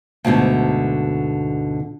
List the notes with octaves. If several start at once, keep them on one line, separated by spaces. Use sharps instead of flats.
D2 G#2 B2 D3